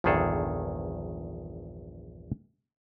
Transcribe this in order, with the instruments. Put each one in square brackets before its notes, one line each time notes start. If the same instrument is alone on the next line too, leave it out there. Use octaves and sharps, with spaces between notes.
[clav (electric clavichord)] A#1 E2 G2 D#3 G#4 A4